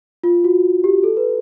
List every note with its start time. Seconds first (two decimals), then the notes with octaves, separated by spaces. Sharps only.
0.24 F4
0.44 F#4
0.84 G4
1.04 A4
1.17 B4